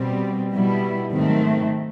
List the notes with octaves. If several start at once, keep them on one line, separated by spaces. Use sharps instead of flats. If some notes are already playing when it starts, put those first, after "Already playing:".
Already playing: B2 G3 C4
B2 G3 B3 E4
G#2 D#3 F#3 A3 C4